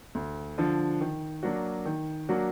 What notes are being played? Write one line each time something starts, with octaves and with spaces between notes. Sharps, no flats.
D2
D3 F3
D#3
F#3 A#3 D4 F#4
D#3
F#3 A#3 D4 F#4